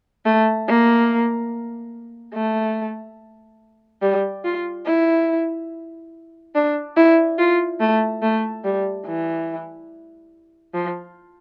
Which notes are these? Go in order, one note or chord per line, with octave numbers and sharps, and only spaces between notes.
A3
A#3
A3
G3
F4
E4
D4
E4
F4
A3
A3
G3
E3
F3